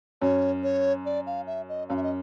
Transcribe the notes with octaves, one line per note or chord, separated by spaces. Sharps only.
F#2 C#5
C#5
D5
F5
E5
D#5
F#2 F5
E5
D#5